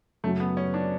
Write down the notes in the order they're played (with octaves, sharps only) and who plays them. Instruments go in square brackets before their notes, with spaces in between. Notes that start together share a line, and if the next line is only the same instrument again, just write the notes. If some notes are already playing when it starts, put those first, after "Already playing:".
[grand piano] F#2 C#3 F#3 [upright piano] A3
[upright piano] B3
C#4
D4